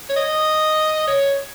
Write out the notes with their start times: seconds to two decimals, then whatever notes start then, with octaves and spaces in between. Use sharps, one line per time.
0.10 C#5
0.16 D#5
1.07 C#5